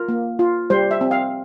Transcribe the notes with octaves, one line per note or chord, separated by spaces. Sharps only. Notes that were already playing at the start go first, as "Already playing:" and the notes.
Already playing: F4 A#4
A#3
F4
G3 C5
E5
C4
F5